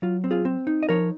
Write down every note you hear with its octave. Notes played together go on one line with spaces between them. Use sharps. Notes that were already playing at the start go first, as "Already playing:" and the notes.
F#3 F4
C4
F4 G#4
C4
D#4
D#5
F3 A#4 C#5